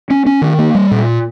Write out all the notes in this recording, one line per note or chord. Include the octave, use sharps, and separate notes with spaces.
C#4
C#4
D#3
A#3
G3
A#2